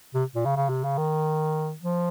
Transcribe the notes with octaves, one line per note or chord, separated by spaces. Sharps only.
C3
A#2
C#3
C#3
C3
C#3
D#3
F3